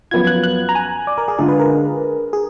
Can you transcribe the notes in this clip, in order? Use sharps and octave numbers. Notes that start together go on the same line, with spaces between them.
F#2 F3 B3 F4 G#6
F#6
F#6
A#5
G#5
D5
A#4
G#4
D3 G#3 D4 F4 G#4
B4
A#4
G#4